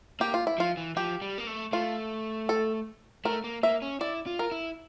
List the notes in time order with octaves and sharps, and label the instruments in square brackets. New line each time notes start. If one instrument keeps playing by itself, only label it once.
[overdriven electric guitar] A#3 [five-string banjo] G4
[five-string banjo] F4
E4
[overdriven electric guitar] F3 [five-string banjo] F4
[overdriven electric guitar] E3
[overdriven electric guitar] F3 [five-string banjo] G4
[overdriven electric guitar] G3
A#3
A3
[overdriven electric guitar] A3 [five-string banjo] F4
[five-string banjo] A4
[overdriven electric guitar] A3 [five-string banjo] A#4
[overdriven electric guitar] A#3
[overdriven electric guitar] A#3 [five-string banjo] E5
[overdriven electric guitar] C#4
[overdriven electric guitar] E4 [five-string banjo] D5
[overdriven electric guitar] F4
[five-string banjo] A#4
[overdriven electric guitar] E4